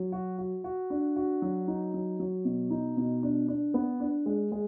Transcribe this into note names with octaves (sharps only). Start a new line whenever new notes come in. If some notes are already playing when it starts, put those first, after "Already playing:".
Already playing: F#3
F#4
F#4
F#4
D4
F#4
F#3
D#4
F#3
F#3
B2
D#4
B2
D4
D4
B3
D4
G#3
G#3